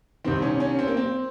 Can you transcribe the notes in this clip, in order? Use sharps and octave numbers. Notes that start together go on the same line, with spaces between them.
C2 C3 D#3 C4
C#4
C#4
C4
A#3
C4